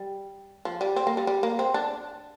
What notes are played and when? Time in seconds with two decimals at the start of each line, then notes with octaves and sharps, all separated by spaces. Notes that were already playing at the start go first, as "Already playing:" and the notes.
Already playing: G3
0.65 F3
0.81 G3
0.96 C4
1.07 A#3
1.17 G3
1.27 G3
1.43 A#3
1.59 C4
1.74 D4